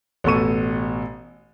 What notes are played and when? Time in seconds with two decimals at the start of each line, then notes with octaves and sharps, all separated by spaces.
0.24 A1 B2 A4 C#6 D#7